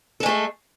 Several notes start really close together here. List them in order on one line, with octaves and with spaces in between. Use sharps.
A4 G#3 A3 G#4